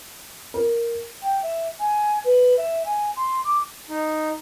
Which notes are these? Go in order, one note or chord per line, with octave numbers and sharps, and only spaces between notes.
A#4
G5
E5
G#5
B4
E5
G#5
C6
D6
D#4